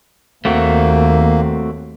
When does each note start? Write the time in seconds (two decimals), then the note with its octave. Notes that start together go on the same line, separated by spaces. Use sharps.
0.45 D#2 A3 A#3 C4 F#4